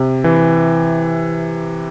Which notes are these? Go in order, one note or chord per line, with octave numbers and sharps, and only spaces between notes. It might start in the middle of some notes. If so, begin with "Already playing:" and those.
Already playing: C3
E3